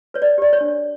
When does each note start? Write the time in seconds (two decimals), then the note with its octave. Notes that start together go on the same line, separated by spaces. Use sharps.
0.14 B4 C#5
0.22 D5
0.38 G4 D5
0.53 C#5
0.61 D4